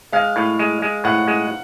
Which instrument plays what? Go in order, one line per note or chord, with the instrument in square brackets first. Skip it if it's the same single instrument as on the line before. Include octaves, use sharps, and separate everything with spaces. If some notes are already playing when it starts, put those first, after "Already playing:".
[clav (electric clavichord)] G#3 [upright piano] F5
[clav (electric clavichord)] A2
G#3
G#3
[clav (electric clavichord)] A2 [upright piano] F#5
[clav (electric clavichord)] G#3